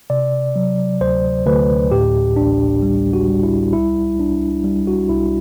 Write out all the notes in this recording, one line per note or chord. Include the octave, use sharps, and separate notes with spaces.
C3 D5
F#3
D2 C5
D2 B4
A2 G4
A1 D4
G3
F#4
G3
E4
C2 E4
C2 D4
G3
F#4
C2 E4